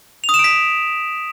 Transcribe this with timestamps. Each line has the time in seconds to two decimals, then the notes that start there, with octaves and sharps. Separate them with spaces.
0.24 F7
0.29 D#6
0.34 E7
0.39 D7
0.44 B6